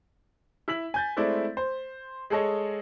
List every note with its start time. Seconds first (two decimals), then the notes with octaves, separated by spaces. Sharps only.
0.68 E4 E6 B6 F#7
0.94 G#5 G6 A6
1.17 G#3 A3 C4 E4 D5
1.57 C5
2.30 G#3 G#4 A4 C#5 D#5